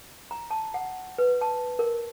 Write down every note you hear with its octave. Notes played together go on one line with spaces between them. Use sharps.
A#5
A5
F#5
B4
A5
A#4